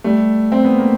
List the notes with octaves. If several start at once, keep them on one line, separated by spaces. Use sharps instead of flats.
G3 A3
C4
B3
A#3